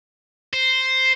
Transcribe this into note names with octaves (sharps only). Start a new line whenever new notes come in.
C5